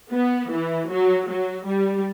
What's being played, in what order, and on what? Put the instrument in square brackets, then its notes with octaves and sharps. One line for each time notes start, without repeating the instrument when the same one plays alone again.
[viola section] B3
E3
F#3
F#3
G3